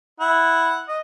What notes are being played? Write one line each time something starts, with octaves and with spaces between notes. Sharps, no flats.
E4 F#5
D#5